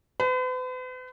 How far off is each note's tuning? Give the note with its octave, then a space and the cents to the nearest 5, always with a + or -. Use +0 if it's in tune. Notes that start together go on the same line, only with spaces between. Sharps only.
B4 +45